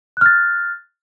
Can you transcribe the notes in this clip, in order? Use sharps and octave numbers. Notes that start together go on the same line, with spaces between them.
F6 F#6 A6